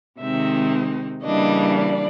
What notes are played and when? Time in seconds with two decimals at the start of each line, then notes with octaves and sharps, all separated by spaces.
0.20 C3 D#3 G#3 C4 D#4 E5
1.23 C#3 E3 G3 A#3 D4 D#5
1.74 D5